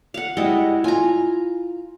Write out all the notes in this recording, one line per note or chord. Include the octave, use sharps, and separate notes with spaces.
F5 F#5
G3 G#3 E4 F#4 D#5
F4 G#5 A#5